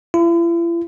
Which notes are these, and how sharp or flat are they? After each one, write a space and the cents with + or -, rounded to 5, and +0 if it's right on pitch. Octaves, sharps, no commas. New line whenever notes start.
E4 +45